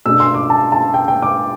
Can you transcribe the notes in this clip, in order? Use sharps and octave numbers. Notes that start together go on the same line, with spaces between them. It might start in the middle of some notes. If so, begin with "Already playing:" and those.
B2 A3 D4 E6
C6
D6
A5
A5
G5
G5
D6